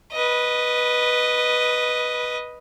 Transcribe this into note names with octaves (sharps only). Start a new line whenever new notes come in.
B4 D#5